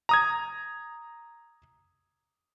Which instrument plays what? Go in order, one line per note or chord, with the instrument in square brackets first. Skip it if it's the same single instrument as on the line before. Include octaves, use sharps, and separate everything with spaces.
[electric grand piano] A#5 D#6 G#6